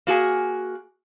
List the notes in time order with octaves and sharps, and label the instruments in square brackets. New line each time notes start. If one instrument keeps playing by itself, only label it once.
[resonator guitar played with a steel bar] A#3 F#4 G#4 G#5